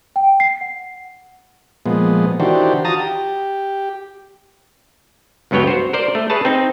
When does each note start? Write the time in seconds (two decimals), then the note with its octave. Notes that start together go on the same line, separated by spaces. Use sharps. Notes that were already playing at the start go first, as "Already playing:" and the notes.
0.16 G5
0.40 C7
0.61 F#5
1.86 A#2 F3 G#3 B3
2.40 D#3 E3 D4 F#4 G4 C5
2.85 F4 F#4 A5 A#5 D#6
2.99 G4
5.51 C#2 G2 F#3 B3 C#5 G5
5.67 F#4 C5
5.93 A#4 C5 D5
6.15 A3
6.30 G#4 B4 C#5 A5
6.45 C4 D#4